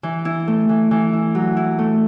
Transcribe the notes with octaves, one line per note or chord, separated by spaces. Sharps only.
E3
E4
A3
E3
E3
E4
F#3
E4
A3